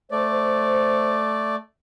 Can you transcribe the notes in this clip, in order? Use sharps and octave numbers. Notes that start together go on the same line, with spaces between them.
A3 C5 D5